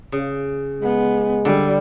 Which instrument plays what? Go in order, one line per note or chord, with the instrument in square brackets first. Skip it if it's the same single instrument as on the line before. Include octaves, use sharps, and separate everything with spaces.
[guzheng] C#3
[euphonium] G#3 [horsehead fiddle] B3
[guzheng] D3 [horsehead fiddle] G3